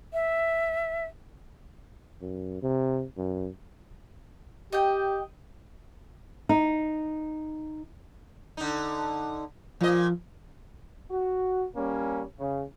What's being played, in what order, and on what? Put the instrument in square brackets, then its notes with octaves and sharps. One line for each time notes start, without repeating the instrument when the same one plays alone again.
[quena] E5
[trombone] F#2
C3
F#2
[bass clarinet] G4 [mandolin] D#5 G5
[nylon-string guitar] D#4
[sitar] D3 D#4
[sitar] A#2 D#5 [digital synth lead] F3
[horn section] F#4
G3 A#3 C#4
C#3